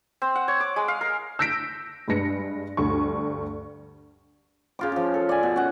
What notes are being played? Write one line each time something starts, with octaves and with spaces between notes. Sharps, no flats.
C4
F#5
C#5
D6
G#3
F5
A#4
E6 G6 A#6 B6 D7
G2 G#3 B4 A#6 C#7
D2 G2 C#6
C#3 F4 D6
C#3 F3
A4
D5 G#5
B2
C#4 F#5